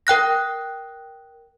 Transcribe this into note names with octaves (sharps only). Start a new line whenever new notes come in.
A#4 G5 F#6 A#6